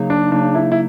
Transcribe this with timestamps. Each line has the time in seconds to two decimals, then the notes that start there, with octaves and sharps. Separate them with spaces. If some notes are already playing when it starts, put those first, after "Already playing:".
Already playing: C#3 F#3 A#3 D#4
0.10 D4
0.32 C#3 F#3 A#3 D4 D#4
0.55 E4
0.72 E4